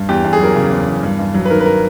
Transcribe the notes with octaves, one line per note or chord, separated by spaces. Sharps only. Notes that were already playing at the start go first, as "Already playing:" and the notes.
Already playing: G2
E2 G4
E2
G#4
F#3 A#4
C#3
E2
E2
G2
G2
F#3
B4
D#3 A#4
B4
A#4